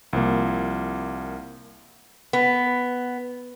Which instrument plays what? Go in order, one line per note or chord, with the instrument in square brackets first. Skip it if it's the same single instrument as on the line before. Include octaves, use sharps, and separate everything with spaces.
[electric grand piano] C2 F3 A#3
[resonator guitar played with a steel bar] B3